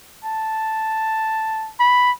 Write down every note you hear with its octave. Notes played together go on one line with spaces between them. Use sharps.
A5
B5